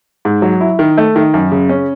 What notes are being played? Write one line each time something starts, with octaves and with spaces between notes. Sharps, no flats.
G#2
F#3
E4
D#3
A3
D#3
F#2
C#3
C#4